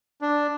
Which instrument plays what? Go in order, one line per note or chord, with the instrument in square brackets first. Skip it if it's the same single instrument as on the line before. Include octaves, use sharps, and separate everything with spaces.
[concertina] D4